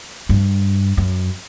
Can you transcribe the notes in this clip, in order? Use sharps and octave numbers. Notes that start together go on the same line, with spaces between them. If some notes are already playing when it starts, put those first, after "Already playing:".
G2
F#2